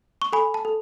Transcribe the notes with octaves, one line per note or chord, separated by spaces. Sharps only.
C#6
A4 G#5 B5
A5
A4